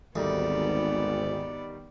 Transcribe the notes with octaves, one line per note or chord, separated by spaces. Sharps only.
G#1 D2 G#2 D#3 G3 B3 D#4 D5